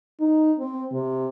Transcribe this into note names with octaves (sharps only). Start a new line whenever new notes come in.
D#4
C4
C3